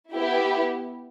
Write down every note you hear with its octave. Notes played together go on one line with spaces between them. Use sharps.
B3 E4 G4